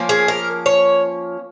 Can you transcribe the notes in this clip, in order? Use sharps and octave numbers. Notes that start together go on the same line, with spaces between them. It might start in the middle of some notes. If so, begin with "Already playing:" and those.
Already playing: F3 A#3 C#4
G#4
A#4
C#5